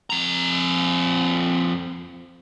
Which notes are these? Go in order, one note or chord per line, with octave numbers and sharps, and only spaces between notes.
F2 A#5